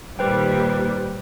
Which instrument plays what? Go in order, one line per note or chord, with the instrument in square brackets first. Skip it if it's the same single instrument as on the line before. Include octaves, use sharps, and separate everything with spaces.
[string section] A#2 D#3 G3 [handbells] B4 C5 G5